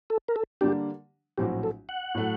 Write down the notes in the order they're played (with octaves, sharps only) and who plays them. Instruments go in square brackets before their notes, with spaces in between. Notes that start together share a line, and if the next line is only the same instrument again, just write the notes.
[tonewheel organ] A4
A#4
A4
[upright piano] D3 G3 A#3 D4 [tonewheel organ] G4
[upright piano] A#1 A2 F#3 C4 F#4 [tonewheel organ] G4
[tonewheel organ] A4
F#5
[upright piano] A2 F#3 A3